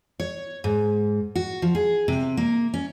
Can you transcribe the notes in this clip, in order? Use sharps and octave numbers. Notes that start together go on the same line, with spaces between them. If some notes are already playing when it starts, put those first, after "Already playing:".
C#5
G#2
F#4
F3
G#4
C3
A#3
C#4